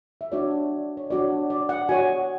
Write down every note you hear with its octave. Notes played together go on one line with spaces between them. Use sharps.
E5
D4 F#4 C#5 D5
C#5
D4 F#4 C#5 D5
D5
F#5
F#4 C#5 G#5